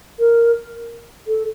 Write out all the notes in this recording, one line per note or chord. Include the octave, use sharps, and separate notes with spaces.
A#4
A4